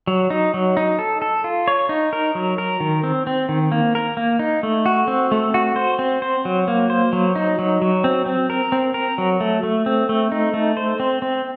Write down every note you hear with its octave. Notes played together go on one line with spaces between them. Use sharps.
F#3
D#4
F#3
D#4
A4
A4
F4
C#5
D#4
A#4
F#3
A#4
D#3
C4
C4
D#3
A#3
A#4
A#3
D#4
A3
F#4
C4
A3
F#4
C5
C4
C5
F#3
A#3
C5
F#3
D#4
F#3
F#3
C4
C4
A#4
C4
A#4
F#3
A3
A3
C4
A3
D#4
A3
C5
C4
C4